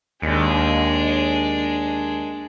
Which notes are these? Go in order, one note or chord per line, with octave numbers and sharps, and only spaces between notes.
D#2 G#3 D4